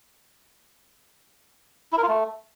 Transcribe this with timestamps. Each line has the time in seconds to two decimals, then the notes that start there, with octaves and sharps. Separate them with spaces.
1.93 E4
1.98 A#4
2.03 F4
2.08 A3